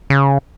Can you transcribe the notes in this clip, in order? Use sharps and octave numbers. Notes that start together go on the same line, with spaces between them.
C#3